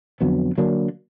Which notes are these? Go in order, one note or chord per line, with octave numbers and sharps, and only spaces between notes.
F2 D3 F#3 B3
D3 F#3 A#3 D4